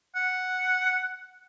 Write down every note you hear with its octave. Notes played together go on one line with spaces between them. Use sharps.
F#5